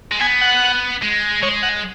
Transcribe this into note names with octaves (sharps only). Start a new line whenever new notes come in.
G#3
B3 G#5
F#5
G#3
G#3 C#5
F#5